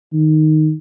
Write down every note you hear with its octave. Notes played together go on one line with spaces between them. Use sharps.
D#3